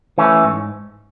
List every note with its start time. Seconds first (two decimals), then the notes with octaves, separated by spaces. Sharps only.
0.18 E3 A3 C#4
0.44 G#2